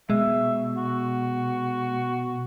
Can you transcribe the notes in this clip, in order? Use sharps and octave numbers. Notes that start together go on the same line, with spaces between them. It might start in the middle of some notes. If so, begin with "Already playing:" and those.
B2 G#3 E5
F#4